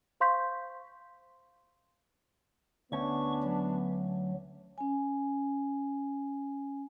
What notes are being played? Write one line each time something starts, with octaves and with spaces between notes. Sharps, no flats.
C5 F5 C6 C#6 G6 B6
D2 B3 C#4 D4 C#6
F#3
C#4 G#5